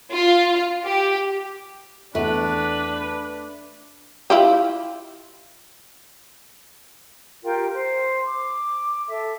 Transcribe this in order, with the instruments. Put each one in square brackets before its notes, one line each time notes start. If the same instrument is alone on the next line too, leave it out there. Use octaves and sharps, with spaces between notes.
[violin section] F4
G4
[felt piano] E2 [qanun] A3 [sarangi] D4 [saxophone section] B4
[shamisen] E4 F4 G4
[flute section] F4 G4 A#4 G5
C5
D6
A4 E5